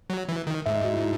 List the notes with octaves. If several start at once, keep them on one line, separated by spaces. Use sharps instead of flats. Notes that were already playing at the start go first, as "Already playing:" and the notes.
F#3
E3
D#3
G#2 E5
D#5
F#4
E4
D#4